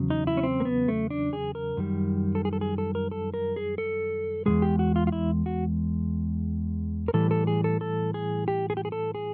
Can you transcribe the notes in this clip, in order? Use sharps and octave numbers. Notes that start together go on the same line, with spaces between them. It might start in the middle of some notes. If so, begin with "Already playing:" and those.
Already playing: E2 C#3 F#3
D#4
E4
C#4
C4
A#3
B3
A3
D4
G#4
A#4
F#2 D#3 G3
A4
G#4
A4
G#4
A4
A#4
A4
A#4
G#4
A4
E2 B2 G#3 G#4
G4
F#4
F4
F4
E4
F#4
A#4
A2 E3 G3 A4
A4
G#4
A4
A4
G#4
G4
G#4
G4
G#4
A4
G#4